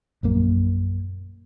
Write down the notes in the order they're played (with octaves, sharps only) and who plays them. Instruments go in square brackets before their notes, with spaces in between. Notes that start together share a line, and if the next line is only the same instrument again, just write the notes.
[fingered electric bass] A#1 F#2 A#3